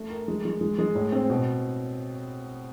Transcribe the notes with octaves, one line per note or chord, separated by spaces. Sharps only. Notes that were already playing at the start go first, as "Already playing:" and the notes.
Already playing: A3
A#4
G#3
G#3
G#3
G#3
A2
C4
B2